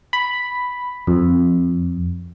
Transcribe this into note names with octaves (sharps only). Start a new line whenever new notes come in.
B5
F2